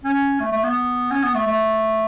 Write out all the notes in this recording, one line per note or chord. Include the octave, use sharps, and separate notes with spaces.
C#4
A3
A3
B3
C#4
B3
A3
A3